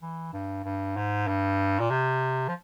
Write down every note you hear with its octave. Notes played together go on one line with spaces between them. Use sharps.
E3
G2
G2
G#2
G2
A#2
C3
F3